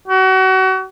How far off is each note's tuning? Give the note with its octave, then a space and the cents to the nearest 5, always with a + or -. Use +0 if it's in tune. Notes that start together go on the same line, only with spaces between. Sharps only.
F#4 +35